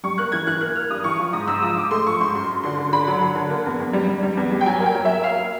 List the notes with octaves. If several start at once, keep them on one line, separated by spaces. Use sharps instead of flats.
G3 C#6
A#3 F#6
E3 G#6
E3 F#6
A#3 F#6
A#3 F6
G2 D#6
E3 C#6
F3
G#2 D#6
G#2 E6
F3 D#6
G#2 D6
A3 C6
F3 C#6
G#2 C6
F#2 C6
F#2
D3 C6
D3
D3 B5
F#3
D3
D3
A#3
E2
E2
G3
G3
G3
E2
G3
G5
F#3 G#5
A#3
G5
F#3
A#3 E5
A#3 F5
A#3